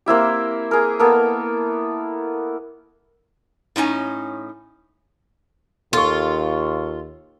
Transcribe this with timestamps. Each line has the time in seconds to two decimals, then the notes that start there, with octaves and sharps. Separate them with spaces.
0.06 A#3 C4 E4 G4
0.71 G#4 A#4
0.99 A#3 B3 A4 A#4
3.76 A2 C#4 D#4 G#5
5.93 D#2 F4 A4 C#6